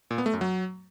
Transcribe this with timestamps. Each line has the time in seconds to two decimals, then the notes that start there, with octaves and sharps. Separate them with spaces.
0.11 A#2
0.18 B3
0.26 A3
0.33 F#2
0.41 F#3